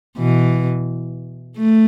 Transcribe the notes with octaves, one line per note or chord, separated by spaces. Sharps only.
B2 E3
A3